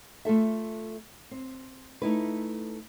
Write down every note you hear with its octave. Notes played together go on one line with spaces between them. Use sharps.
A3 F4 A4 E5
C4
A3 D#4 E4 B4